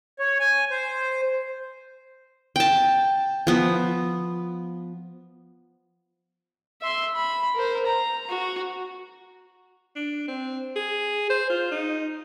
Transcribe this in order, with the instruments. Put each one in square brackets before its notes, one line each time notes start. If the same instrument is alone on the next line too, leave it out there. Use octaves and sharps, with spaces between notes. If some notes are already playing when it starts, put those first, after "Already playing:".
[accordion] C#5
G#5
C5
[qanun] G5 A5
F3 B3
[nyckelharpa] E5 C6
B5
A#4 C5
A#5
F#4
[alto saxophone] D4
C4
G#4
C5
F4
D#4